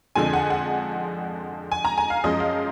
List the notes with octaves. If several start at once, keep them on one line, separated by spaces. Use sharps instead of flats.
F2 D3 F3 G#3 G#5
F#5
F#5
G#5
A#5
G#5
F5
F#2 F3 G#3 D#5
F5